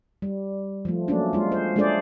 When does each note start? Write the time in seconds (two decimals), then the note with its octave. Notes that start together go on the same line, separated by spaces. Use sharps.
0.22 G3
0.85 F3 A3
1.08 F#3 A3 A#3 C#4 D4
1.33 G#3 F4
1.52 C5
1.76 G#3 A3 D4 G#4 C5 D5